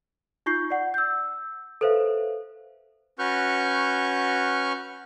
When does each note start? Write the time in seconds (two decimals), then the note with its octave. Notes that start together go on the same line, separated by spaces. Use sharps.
0.46 D#4 F4 C#6 G6 C7
0.70 D5 F#5
0.94 E6 G6
1.81 A4 B4 C5 E5 F5
3.19 C#4 F#4 B4 C#6 F6 G6